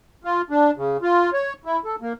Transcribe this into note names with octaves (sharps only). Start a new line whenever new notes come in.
F4
D4
C#3
F4
C#5
E4
A4
A#3